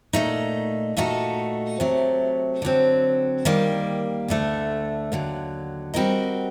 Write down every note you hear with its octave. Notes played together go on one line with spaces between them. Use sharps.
A#2 A3 D#4
A#2 A3 D#4 F#4 A4
C3 F#3 A3
D3 F#3 C4
D#3 G3 A#3
D2 D3 A3
D#2 D3 F#3
G3 C4 F#4 A#4 D#5